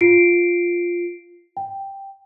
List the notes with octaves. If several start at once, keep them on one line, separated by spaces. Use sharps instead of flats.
F4 C7 D7
G5